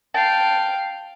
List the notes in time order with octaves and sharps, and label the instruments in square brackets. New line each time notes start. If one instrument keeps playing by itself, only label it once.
[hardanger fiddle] F5 G5 [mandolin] A5